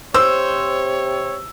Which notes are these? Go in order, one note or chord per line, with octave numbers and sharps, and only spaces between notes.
C3 C5 C#5 E6